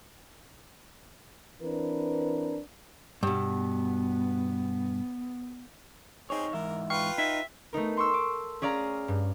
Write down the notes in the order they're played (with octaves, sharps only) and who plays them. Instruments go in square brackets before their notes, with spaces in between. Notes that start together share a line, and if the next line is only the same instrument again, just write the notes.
[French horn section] E3 C4 D4 A#4 B4
[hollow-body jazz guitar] G2 B2 [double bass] B3
[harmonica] C4 G#4 [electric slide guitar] D#4 C#5
[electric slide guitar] G#2 E3 E5 [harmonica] A#4
[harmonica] F4 B4 [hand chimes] G5 F6 C7 [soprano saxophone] C#6
[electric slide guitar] D#4 [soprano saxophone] E5
[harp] A3 B3 D#4 A#4
C6 C#6 E6
D6
C#4 G#4 D5 F5 A#5
G2